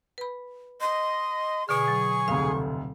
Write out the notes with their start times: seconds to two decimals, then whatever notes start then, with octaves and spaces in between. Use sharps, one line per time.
0.18 B4 B5
0.81 D#5 C6
1.69 B2 D3 G#4 C#6
1.88 F#3
2.28 F1 D2 F5